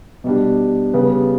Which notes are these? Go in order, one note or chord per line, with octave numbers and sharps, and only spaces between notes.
B2 G3 D4
C#3 G3 B3